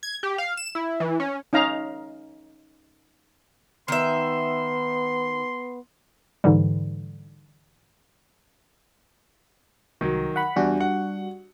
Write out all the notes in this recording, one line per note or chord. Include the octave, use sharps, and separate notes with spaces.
G#6
G4
F5
E7
E4
E3
C#4
C#4 D#4 F5 A#5
D#3 B3 E5 C6
G#2 D3 E3 G3
C2 D#3 F#3
F#5 B5
E2 G3 D4 F#4
F#5